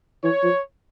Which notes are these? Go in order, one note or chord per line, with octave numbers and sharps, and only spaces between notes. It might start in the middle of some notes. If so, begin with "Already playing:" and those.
E3 C#5
F3